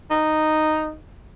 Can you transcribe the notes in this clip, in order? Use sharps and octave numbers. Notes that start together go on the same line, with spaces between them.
D#4